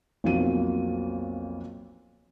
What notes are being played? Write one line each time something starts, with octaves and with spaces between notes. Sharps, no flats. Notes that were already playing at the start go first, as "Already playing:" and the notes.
B1 F2 A#3 F4 F#4 D#7